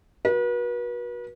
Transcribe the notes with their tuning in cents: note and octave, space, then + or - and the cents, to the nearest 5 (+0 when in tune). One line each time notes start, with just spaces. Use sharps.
F#4 -5 B4 -40